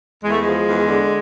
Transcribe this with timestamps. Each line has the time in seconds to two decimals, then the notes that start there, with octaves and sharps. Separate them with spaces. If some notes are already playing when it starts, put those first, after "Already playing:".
0.23 E2 G#3
0.31 A3
0.39 G#3
0.45 F3
0.66 E2
0.88 D3